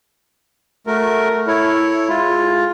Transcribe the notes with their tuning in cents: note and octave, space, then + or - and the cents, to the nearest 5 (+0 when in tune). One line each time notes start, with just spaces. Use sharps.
A3 -5 F#4 -10 A#4 +0
E4 +0 A4 +0 C#5 +0
G#3 +0 F4 +10